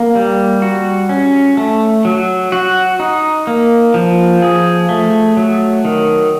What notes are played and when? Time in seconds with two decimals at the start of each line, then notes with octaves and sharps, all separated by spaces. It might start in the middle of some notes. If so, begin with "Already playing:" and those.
Already playing: A#3
0.15 G3
0.62 F#4
1.09 C#4
1.57 A3
2.05 F#3
2.52 F#4
3.00 D#4
3.47 A#3
3.94 F3
4.42 G#4
4.89 A3
5.37 F#3
5.85 D#3